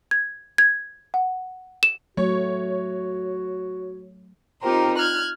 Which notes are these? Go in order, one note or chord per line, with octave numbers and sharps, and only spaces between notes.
G#6
G#6
F#5
E7
F#3 A3 F#4 C#5
C4 D#4 F4 G4 A#4 C5
F6 F#6 G#6